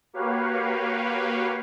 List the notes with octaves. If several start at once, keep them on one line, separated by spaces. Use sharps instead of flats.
A#3 F#4 G4 B4 C#5 F5